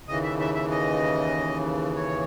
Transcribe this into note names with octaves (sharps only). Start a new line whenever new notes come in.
D#2 C#3 E3 D#5
E5
E5
E5
D#5
C#5